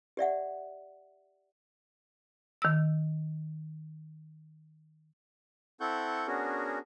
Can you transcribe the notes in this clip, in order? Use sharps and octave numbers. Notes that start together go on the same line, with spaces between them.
G4 D5 E5 F#5
D#3 E6
C4 E4 A4 F#5 C#6 G6
B3 C#4 D4 F#4 G#4 A#4